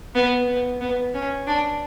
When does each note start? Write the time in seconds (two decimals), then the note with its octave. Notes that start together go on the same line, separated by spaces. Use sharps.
0.15 B3
0.48 B3
0.81 B3
1.14 C#4
1.47 D4